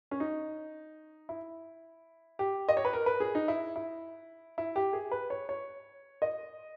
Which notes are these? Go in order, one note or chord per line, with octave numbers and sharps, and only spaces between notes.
C#4
D#4
E4
G4
D#5
C#5
B4
A#4
B4
G#4
D#4
E4
E4
E4
G4
G#4
B4
C#5
C#5
D#5